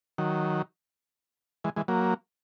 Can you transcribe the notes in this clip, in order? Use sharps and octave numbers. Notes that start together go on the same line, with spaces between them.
D#3 F#3
E3 G#3
E3 G#3
F#3 A#3